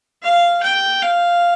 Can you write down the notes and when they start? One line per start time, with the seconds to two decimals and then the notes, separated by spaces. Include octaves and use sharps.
0.23 F5
0.63 G5
1.02 F5